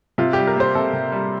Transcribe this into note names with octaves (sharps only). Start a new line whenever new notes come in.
C3 F4
G3 G4
A#4
A#3 C5
C3 A4
C3
G3